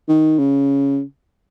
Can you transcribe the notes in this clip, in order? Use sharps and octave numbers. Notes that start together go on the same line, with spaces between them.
D#3
C#3